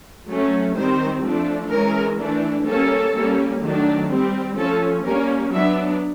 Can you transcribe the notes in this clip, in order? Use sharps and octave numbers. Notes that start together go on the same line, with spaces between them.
F#3 A3 C#4
D#3 G3 C4 C5
F3 A3 D4
E3 G#3 C#4 A#4
E3 A3 D4
G3 A#3 C#4 A4
G3 A#3 C#4
D#3 F#3 A3 D4
G3 C4
F3 A3 C#4 A4
G3 A#3 C#4 A#4
F#3 B3 D4 E5